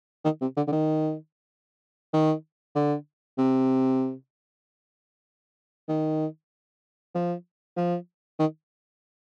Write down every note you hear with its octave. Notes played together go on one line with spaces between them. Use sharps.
D#3
C3
D3
D3
D#3
D#3
D3
C3
D#3
F3
F3
D#3